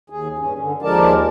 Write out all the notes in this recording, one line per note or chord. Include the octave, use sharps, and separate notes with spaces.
D#2 G#4
G2 C#4
D3
D#2 F3 G#3 A#4 D5 A5